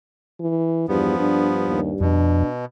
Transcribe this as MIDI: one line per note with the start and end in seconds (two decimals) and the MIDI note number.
0.40 0.88 52
0.89 1.14 40
0.89 1.17 43
0.89 1.80 53
0.89 1.80 59
1.19 2.20 43
1.19 1.50 62
1.68 1.92 39
2.00 2.43 41
2.00 2.65 47
2.00 2.47 62